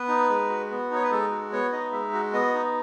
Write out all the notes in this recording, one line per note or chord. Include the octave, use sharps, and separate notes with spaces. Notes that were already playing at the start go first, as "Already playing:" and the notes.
Already playing: B3 B4
D#4
G#3
F#4
B3
D#4 C#5
B4
G#3 A4
F#4
B3 C#5
D#4 D#5
G#3 E5
F#4
B3 D#5
D#4